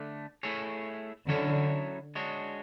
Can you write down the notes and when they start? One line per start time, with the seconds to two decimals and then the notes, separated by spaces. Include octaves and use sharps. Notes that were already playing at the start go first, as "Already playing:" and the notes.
Already playing: D3 A3
0.43 A3 E4 G#4 C#5
1.29 D3 F#3 C#4 E4 A4 C#5
2.15 G#3 D4 F#4 C#5